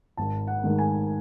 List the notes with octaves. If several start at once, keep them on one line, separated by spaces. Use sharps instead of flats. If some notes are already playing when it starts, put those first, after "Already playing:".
G#1 A5
F#5
G#2 D#3 A3
G#5